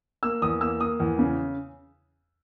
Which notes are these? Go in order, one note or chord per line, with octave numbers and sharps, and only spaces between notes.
A#3 E6
E2 D#6
A#3 E6
A#3 D#6
E2
C#3